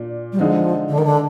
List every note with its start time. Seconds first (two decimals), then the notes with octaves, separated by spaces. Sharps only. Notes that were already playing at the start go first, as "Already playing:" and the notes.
Already playing: A#2 D4
0.33 G3
0.39 D3 F3 G#3 D#4
0.89 D3
0.98 D#3
1.05 D3